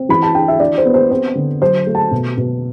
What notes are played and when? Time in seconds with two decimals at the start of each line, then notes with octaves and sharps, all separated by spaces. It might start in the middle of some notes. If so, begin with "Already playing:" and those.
Already playing: C4
0.09 E3 B5
0.22 A5
0.34 D4 G5
0.48 E5
0.60 D4 D5
0.78 C5
0.85 B3
0.94 C5
1.11 C4 C5
1.35 D3
1.62 F#3 C5
1.87 A3
1.95 A5
2.11 B2
2.37 B2